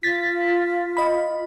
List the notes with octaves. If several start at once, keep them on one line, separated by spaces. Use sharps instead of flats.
F4 A6 B6
D#5 B5